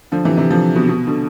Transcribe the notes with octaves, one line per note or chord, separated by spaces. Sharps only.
D3 F3
C3 E3
C3 E3
D3 F3
B2
B2
B2 D3